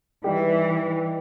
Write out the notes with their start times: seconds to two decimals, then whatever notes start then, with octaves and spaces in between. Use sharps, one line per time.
0.24 E3 G3 D#4 G4